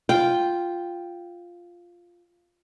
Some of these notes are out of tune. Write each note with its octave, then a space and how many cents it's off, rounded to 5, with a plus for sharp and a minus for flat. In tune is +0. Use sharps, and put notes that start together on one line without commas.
F4 +0 G5 +0